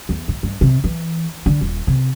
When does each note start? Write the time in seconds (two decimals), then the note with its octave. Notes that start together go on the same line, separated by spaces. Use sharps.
0.09 E2
0.28 A2
0.43 G2
0.61 C3
0.84 E3
1.46 D3
1.61 D#1
1.87 C3